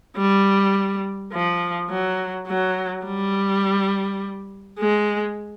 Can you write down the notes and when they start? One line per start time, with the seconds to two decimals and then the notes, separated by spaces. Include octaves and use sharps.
0.17 G3
1.33 F3
1.90 F#3
2.48 F#3
3.06 G3
4.79 G#3